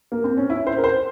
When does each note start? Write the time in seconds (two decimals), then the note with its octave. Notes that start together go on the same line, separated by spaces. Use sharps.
0.12 A#3
0.24 C4
0.38 C#4
0.50 E4
0.67 C5
0.78 A#4
0.84 C5